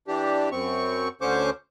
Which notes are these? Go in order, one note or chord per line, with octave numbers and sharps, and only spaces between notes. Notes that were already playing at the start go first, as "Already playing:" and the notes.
E3 D4 G4
F#2 C4 C#6
D2 D3 C#4 C5 C#6 D6